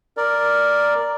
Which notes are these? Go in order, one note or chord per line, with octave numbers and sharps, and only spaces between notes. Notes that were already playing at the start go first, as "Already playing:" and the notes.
A#4 D5